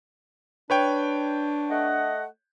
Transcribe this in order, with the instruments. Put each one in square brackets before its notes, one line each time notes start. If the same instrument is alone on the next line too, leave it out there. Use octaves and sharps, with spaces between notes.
[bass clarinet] D4 [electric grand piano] B4 C#5 G5
[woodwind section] A3 D#5 F#5